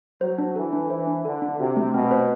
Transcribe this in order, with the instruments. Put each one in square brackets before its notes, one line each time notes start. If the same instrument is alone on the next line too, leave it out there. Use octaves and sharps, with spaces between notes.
[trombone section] F#3 [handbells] C5
[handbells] D4
[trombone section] E3 [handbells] A4
[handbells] D4
[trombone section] E3 [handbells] C5
[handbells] D4
[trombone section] D3 [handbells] A4
[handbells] D4
[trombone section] C3 [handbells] F#4
[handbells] A3
[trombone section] B2 [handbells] C4
[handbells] C5